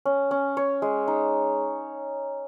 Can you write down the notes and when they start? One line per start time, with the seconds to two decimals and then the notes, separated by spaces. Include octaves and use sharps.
0.05 C#4
0.31 C#4
0.57 C#5
0.82 G#3
1.08 D#4